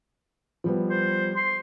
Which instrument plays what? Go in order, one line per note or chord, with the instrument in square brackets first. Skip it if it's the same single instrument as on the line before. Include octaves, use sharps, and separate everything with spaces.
[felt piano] F3 G3 B3
[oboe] C5
C6